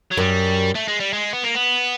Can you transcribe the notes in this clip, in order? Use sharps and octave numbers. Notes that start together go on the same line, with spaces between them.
F#3
F#2 G3
A3
G#3
G3
G#3
B3
A#3
B3